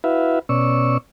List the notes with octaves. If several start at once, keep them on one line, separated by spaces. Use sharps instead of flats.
E4 F#4 B4 E5 F5
B2 C#4 D5 C#6 E6